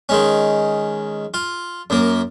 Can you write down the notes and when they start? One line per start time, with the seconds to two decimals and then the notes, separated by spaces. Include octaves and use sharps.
0.09 D#3 G#3 C#4
1.34 F4
1.90 F#2 A#3